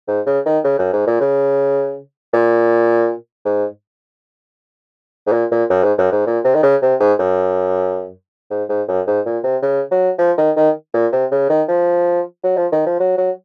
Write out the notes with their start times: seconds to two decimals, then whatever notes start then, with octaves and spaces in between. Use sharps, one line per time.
0.08 G#2
0.27 C#3
0.46 D#3
0.64 C#3
0.79 F#2
0.93 G#2
1.07 A#2
1.21 C#3
2.33 A#2
3.45 G#2
5.27 G#2
5.32 A#2
5.51 A#2
5.70 F#2
5.83 G#2
5.98 F#2
6.12 G#2
6.27 A#2
6.45 C3
6.55 D#3
6.63 C#3
6.82 C3
7.00 G#2
7.19 F#2
8.51 G#2
8.69 G#2
8.88 F#2
9.07 G#2
9.26 A#2
9.44 C3
9.62 C#3
9.92 F#3
10.19 F3
10.38 D#3
10.57 D#3
10.94 A#2
11.12 C3
11.32 C#3
11.50 D#3
11.69 F3
12.44 F#3
12.57 F3
12.72 D#3
12.86 F3
13.00 F#3
13.18 F#3